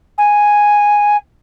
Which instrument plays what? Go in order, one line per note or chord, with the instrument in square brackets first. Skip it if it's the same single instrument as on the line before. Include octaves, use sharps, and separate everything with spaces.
[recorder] G#5